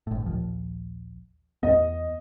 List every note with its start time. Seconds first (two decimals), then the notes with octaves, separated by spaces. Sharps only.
0.07 G1 A2
0.26 A#1 D#2 F3
1.63 E2 B3 D#5